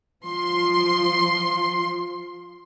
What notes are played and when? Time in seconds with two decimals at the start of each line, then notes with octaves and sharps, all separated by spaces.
0.24 F3 C6